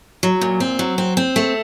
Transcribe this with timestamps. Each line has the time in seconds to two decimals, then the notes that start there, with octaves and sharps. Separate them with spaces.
0.23 F#3
0.41 A#2
0.60 C4
0.79 F#3
0.98 C4
1.17 C4
1.36 A3